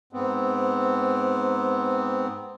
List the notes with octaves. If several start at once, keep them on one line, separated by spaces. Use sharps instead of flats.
G#2 B3 C4